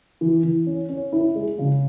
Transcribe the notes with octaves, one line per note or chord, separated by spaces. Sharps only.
E3
E3
C#4
C#4
E4
G#3
C#3